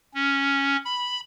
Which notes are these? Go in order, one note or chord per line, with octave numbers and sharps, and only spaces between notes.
C#4
B5